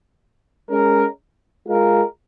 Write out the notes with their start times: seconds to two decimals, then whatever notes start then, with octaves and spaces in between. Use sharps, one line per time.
0.69 G#3 C#4 A#4
1.68 G#3 F4 A#4